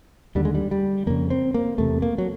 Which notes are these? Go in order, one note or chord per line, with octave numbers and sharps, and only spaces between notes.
D#2 D3 G3
G#3
G3
G3
F2 C#3 A#3
C4
A#3
E2 C3 A3
A#3
F#3